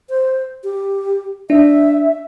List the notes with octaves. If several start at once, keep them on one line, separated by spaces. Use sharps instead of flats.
C5
G4
D4 E5